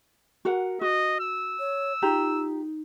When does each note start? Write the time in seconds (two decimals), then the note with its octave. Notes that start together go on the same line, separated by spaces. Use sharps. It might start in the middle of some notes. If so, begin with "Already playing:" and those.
0.45 F#4 A#4 F#5
0.81 F#4 D#5
1.20 E6
1.59 C#5
2.02 D#4 F4 G4 A#5